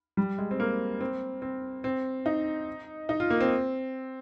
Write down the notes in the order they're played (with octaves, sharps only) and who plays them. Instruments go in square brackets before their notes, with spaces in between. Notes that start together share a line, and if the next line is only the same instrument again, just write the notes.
[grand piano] G3
G#3
C4
A#3
C4
C4
C4
D#4
D#4
F4
A#3
C4